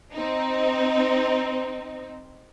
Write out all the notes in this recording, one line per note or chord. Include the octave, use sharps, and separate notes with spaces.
C4 D#4